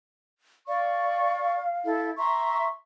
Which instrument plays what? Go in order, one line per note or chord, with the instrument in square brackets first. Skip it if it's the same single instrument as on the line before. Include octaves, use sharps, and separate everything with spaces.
[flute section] D5 C#6 [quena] F5
[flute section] E4 A4
[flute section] E5 A#5 C6 [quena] C#6